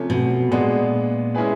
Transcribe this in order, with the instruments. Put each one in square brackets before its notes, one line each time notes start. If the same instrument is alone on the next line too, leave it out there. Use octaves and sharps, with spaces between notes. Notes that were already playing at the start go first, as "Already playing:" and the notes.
Already playing: [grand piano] C3 F3 A3 C#4
[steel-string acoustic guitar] B2
[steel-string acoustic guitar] A#2 [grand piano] G#3 B3 D4
[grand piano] G#3 C#4 E4 G#4 B4